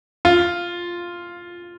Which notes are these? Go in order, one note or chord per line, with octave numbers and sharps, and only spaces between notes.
F4